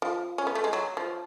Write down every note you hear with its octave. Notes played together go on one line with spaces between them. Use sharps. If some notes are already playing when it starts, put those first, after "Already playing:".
F3
C#4
B3
A3
G#3
F#3
F3